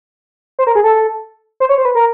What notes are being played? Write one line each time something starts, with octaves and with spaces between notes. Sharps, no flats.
C5
A#4
G#4
A4
C5
C#5
C5
B4
A#4